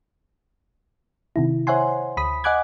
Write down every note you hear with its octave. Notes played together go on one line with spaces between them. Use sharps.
C3 D#3 E4
C5 C#5 E5 F#5 G#5 C6
D2 B5 D#6 B6
D#5 F#5 G#5 D6 F#6 G#6